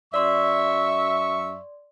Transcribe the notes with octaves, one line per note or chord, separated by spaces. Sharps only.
F#2 D5 E5 C6 C#6